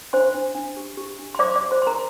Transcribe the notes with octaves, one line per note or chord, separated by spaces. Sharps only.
D4 C5 C6
D4
D4
G4
G4
D4
C6
C5 D5 D6
D5 D6
G4
C5 C6
C5 C6
A#4 A#5